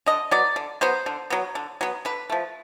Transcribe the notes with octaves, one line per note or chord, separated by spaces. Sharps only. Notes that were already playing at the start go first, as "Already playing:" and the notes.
D3 D#5
F#3 B3 D5
D3
F#3 B3 C5
D3
F#3 B3
D3
F#3 B3
D3 B4
F3 A3